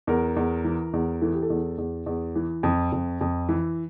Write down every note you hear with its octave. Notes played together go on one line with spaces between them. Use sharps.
E2 A#4
E2
E3
E2
E3 A4
G4
A4
E2
E2
E2
E3
F2
F2
F2
E3